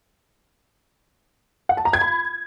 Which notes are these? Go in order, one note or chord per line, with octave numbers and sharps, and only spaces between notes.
F#5
A5
A#5
G#6
B5